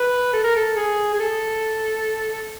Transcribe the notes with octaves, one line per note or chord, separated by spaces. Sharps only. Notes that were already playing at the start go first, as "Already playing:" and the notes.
Already playing: B4
A4
A#4
A4
G#4
G#4
A4